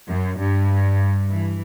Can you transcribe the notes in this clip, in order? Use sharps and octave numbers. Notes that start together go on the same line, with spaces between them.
F#2
G2
E3